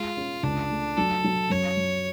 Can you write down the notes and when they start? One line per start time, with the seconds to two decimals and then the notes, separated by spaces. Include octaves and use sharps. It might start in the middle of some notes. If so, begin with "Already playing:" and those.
Already playing: G#3 F4
0.17 C#4
0.43 C#2 D4
0.70 A3
0.97 F#3 A4
1.24 F#3
1.50 F#2 C#5
1.77 F#2